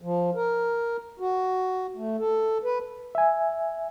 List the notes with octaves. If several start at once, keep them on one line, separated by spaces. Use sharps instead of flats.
F3
A#4
F#4
A3
A4
B4
E5 G#5